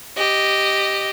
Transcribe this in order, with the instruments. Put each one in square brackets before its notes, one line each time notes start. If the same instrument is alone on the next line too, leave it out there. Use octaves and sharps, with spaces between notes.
[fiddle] G4 D#5